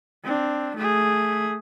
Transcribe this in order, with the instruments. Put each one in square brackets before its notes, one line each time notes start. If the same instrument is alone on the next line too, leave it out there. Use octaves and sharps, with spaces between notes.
[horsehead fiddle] C4 D4
A3 G#4